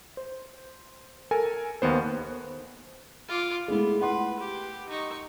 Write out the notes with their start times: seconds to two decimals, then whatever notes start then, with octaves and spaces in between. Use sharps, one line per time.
0.17 C5
1.31 A4 A#4 G#5
1.82 D#2 D#3 B3 C5
3.28 F4 D6
3.68 G#3 A3 B3 E4
4.01 B4 F#5 C6
4.40 G4
4.89 D#4 C#6